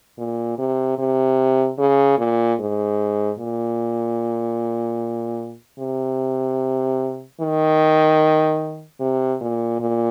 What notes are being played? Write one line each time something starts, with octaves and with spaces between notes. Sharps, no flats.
A#2
C3
C3
C#3
A#2
G#2
A#2
C3
D#3
C3
A#2
A#2